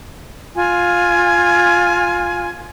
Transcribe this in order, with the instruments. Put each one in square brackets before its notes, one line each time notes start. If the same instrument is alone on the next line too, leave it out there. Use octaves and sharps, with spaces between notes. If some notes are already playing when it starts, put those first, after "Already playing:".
[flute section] F4 G#5